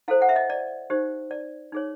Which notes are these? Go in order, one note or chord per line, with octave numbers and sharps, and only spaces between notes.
E4 A4 C5 F5
F#5
E5
D#5
D5
D#4 G4 C5
D5
D#4 G#4 C#5